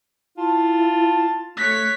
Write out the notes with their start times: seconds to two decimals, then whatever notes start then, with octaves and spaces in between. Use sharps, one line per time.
0.37 E4 F4 A5
1.57 A3 C#5 F#6 B6